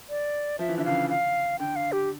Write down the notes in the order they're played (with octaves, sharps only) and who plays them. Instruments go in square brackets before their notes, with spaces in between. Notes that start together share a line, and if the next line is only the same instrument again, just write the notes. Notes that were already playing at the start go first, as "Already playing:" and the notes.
[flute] D5
[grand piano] F3 [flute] E5
[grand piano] E3
[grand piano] D3 [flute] E5
[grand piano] C#3 E3 [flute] F5
[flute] F5
[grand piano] D3 [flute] G5
[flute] F5
G4